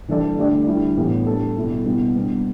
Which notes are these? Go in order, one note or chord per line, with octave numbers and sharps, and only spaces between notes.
E3 G3 D4 A4 D5
D3 A3 D4 G4 D5
D3 G3 E4
A2 E3 B3 G4
G3 D4 A4
B2 G3 E4 A4
B2 G3 B3 E4
G3 B3 D4